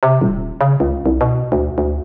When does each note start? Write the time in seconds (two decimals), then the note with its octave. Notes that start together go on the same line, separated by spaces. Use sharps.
0.03 C3
0.21 D#1
0.61 C#3
0.80 C#2
1.06 C2
1.21 B2
1.52 D2
1.78 D2